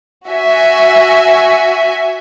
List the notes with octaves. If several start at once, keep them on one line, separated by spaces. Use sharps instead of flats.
F#4 E5 G#5